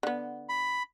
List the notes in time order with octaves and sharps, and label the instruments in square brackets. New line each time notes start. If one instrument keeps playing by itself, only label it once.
[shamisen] D3 B3
[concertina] B5